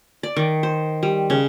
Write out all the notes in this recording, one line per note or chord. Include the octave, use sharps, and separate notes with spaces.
D5
D#3
C5
G3
C#3